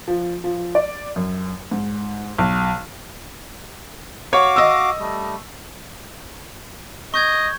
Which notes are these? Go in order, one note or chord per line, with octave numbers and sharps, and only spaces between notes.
F3
F3
D5
F#2
G#2
B1
F#4 C#5 F5 D6
D#5 E6
G3 A3
D#5 C#6 G6 G#6